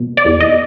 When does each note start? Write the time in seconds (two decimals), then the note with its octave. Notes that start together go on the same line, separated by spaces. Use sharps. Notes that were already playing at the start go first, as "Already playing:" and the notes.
Already playing: B2
0.17 D5
0.25 E2
0.41 D#5